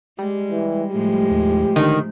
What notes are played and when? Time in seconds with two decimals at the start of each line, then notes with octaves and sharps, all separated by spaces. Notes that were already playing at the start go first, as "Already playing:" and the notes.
0.19 G3 G#3
0.51 E3
0.91 A2 F3 G#3 G4
1.31 D#2
1.76 D3 D#3